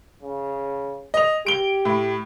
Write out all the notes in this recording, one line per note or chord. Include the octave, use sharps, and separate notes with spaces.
C#3
D#5 F7
G4 D7 G7
A2